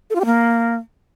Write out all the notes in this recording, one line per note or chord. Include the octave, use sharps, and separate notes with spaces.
A4
F4
G4
A#3